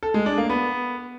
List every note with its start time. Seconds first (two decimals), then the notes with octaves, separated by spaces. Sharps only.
0.03 A4
0.14 G#3
0.26 D4
0.38 A#3
0.49 B3